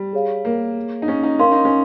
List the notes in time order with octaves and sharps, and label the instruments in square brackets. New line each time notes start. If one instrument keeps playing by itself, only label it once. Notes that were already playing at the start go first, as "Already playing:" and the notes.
Already playing: [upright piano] G3
[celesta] G#4 C#5 F5
[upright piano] A#3
D#4
C#4
D#4
[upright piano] C#4 [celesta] A#4 F5 C6
[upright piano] D#4
C#4